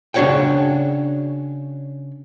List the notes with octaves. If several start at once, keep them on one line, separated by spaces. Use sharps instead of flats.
C#3 D4 F#4 C#5 F#5 G5